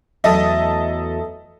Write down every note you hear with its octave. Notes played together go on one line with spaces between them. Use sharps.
E2 F#3 A3 A4 D#5 E5